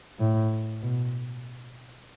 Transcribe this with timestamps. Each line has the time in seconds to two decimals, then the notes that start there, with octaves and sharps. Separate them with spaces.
0.19 A2
0.82 B2